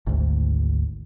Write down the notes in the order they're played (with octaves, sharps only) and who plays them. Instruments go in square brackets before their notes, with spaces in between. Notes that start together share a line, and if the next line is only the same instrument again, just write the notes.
[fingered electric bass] G#1 D2